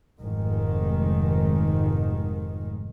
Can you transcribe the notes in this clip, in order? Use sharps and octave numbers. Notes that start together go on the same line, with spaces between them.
F1 G#2 D#3